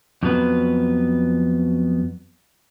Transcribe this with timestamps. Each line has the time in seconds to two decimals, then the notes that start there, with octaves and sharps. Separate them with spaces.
0.23 F2 F3 F#3 B3 B4